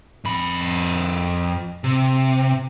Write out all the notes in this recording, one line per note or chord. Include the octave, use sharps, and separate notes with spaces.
F2 B5
C3